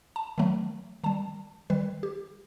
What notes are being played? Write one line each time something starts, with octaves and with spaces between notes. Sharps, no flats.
A5
D#3 F#3 A3
D#3 G3 A5
D#3 G3 B4
G4